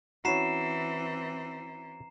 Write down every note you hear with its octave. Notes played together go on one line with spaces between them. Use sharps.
E3 C4 C#4 E4 F#4 A#5 C7 E7